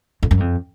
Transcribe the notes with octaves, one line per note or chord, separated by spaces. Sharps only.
F2
F#2
F2